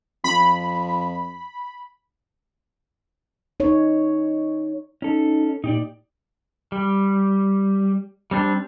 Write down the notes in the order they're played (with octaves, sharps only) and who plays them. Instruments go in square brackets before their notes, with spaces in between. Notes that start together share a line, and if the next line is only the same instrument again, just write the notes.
[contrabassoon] F2 [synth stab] B5
[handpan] D#4 C#5
[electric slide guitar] C#4 A4 [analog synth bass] D#4
[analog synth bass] A#2 [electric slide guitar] D#4 G4 D5
[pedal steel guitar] G3
G3 C4 D4